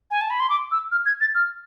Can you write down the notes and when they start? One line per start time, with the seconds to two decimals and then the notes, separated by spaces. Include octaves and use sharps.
0.11 G#5
0.21 A5
0.30 B5
0.40 C6
0.50 D6
0.72 E6
0.92 F6
1.06 G#6
1.21 A6
1.35 F6